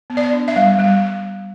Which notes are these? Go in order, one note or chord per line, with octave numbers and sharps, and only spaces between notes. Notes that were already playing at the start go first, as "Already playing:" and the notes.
B3
D5
D4
E5
G3
G3